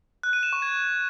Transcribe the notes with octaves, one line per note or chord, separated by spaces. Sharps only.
F#6
D#7
E7
C#6
G#6